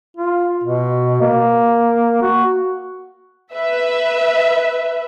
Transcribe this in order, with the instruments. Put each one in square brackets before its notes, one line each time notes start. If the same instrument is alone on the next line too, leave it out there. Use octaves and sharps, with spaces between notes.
[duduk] F4
B2
A#3
F#4
[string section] B4 E5